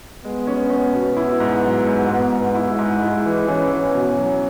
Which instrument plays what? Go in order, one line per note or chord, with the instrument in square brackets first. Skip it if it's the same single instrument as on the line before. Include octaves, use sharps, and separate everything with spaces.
[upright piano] G#3 [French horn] B3
[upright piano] C#4
C#4
B2
E4
G#2
F#3
G#2
[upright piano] G#2 [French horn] B3
[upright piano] G#2
[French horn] B3
[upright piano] E4
[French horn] G#3
[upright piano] G#2
[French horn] G#3 [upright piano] E4
[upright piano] E3
[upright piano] E3 [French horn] C#4
[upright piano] E3
B2
F#3